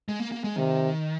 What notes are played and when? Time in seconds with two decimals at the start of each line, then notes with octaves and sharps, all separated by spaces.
0.09 G#3
0.20 A#3
0.32 A#3
0.44 G#3
0.56 C3 D#3